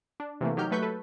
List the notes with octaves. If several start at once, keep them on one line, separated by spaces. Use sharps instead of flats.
D4
C3 E3 A3 A#3
F#3 D#4 G4 F6 G6
F#3 A3 B4 C#6 G6 B6
A4 B4